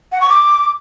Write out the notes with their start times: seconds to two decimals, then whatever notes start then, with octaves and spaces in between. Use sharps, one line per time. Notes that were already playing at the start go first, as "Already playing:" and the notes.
0.12 F#5
0.21 C#6
0.30 D6